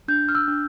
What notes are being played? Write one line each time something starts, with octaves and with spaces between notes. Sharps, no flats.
D4 G6
F6
E6
D4